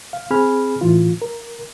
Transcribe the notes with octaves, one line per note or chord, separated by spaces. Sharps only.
F5
C4 G#4 G#5 B5 F6
A2 E3 F4
A#4